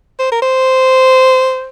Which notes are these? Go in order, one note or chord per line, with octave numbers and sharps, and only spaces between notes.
C5
A#4
C5